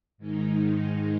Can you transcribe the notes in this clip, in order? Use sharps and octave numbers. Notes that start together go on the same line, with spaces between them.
G#2 D#3 G#3 D#4